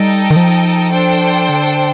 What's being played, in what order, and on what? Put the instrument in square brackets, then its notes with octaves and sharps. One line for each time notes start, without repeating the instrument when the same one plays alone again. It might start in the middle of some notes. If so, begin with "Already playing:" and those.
Already playing: [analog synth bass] G3 [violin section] D#4 A4 D#5 G5
[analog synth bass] D#3
F3
[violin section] D4 A4 C5 G5
[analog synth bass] D3